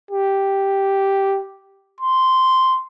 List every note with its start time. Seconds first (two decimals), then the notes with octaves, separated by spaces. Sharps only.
0.11 G4
2.00 C6